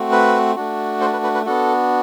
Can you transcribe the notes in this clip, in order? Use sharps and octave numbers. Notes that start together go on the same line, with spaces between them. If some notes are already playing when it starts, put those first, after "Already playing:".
Already playing: A3 C4 F#4
B4
A3 D4 F#4
A4 C5
B4
B4
B4
B3 D4 F#4 A4